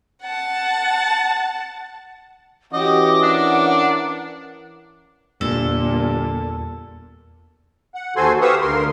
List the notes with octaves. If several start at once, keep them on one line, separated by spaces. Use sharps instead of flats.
F#5 A5
E3 C#4 F#4 G4 D#5 D6
D4 A#4 F#5
G1 E2 A#2 A4
F#5
D#2 F#4 A4 C5 G#5 C6
G4 B4 F5 C#6 D#6 E6
D2 A#4 C6